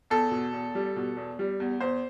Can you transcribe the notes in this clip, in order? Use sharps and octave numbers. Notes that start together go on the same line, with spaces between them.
E2 A4
B2
E2
G3
B2
E2
G3
E2
E2 C5